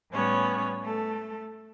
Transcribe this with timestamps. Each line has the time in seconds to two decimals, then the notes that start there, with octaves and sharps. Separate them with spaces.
0.11 A2 G3 B3 C#4 C#5
0.84 A3 A4